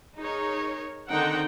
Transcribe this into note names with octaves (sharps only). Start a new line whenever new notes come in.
D#4 G#4 A#4 C#5
D3 D#3 C4 D#4 F#5 G5